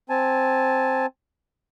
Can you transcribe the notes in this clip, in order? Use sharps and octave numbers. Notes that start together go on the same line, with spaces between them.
C4 G#5 A5